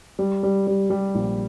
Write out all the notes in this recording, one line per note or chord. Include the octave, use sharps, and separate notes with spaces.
G3
G3
G3
G3
A#1